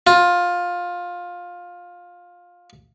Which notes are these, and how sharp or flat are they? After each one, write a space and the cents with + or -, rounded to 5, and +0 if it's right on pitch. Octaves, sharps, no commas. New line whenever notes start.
F4 +15